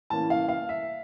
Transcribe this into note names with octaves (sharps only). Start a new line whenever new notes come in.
A2 E3 A#3 C#4 A5
F5
F5
E5